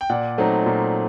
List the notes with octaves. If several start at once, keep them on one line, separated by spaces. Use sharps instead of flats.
G5
A#2 D5 F#5
F#3 A3 C4 D#4
A#2